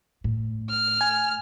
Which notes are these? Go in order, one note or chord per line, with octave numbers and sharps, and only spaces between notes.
A2
F6
G#5